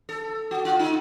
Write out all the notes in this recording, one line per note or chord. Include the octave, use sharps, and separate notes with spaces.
A4
F#4
F4
D#4